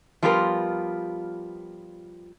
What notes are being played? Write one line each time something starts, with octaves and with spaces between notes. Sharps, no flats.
F3 G3 B3 F4 G4 A#4